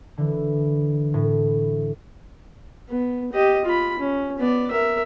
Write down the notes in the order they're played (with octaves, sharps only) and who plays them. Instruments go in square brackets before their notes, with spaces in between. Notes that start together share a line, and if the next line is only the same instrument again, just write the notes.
[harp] D3 E3
A2
[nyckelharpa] B3
G4 D#5
F4 B5
C#4
B3 D5
A#4 E5